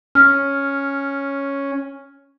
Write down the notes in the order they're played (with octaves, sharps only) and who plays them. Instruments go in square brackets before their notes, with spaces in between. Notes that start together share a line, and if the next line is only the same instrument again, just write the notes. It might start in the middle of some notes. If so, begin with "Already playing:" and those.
[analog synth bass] C#4 [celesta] F6